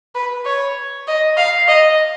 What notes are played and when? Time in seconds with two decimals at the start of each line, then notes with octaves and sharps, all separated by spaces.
0.15 B4
0.45 C#5
1.08 D#5
1.37 F5
1.68 D#5